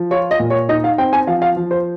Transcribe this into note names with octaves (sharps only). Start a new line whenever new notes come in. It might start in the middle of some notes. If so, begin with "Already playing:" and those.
Already playing: F3
F4 C#5
D#5
A#2
C#5
D#4 D#5
F5
C4 G5
G#5
F3 F5
F5
F3
C5